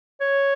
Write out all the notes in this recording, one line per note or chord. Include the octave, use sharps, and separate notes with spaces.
C#5